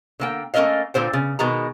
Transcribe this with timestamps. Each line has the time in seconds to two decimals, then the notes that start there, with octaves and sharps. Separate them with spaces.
0.20 D3 A#3 G5
0.54 A3 A#3 C#4 A#4 D#5 F5
0.94 A#2 D3 C5 G5
1.13 C#3
1.39 B2 D#3 G#3 A#5